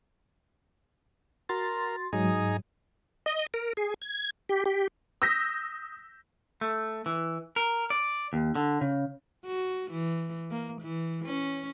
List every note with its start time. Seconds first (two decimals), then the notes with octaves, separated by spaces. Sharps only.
1.49 F#4 A#4 C6 A6
2.13 G#2 F#3 D#4 G#4
3.26 D#5
3.54 A#4
3.77 G#4
4.02 G#6
4.49 G4
4.66 G4
5.22 D#6 E6 G6 A#6 B6
6.61 A3
7.06 E3
7.56 A#4
7.90 D5
8.33 D#2
8.55 D3
8.81 C#3
9.46 F#4
9.92 E3
10.51 A#3
10.82 E3
11.25 C#4